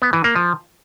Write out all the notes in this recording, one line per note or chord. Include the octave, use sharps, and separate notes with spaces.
B3
E3
A#3
F3